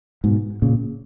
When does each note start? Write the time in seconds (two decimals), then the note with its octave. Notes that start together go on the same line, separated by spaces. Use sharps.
0.24 G#2 B2
0.62 A#2 C#3